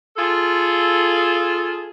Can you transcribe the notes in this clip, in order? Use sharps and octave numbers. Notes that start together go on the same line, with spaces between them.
F4 G#4 A4